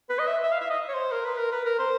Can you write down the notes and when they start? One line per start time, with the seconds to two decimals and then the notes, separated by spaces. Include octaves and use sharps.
0.10 B4
0.19 D#5
0.27 E5
0.43 E5
0.52 F5
0.61 E5
0.70 D#5
0.89 C#5
0.94 C5
1.12 A#4
1.25 B4
1.38 A#4
1.51 B4
1.65 A#4
1.79 C5